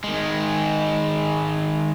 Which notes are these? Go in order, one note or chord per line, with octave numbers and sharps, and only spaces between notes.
D#3 G#3